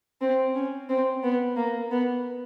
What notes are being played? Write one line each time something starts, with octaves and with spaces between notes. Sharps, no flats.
C4
C#4
C4
B3
A#3
B3